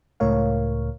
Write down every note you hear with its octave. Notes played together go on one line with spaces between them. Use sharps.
C#2 A2 A#4 C#5 F5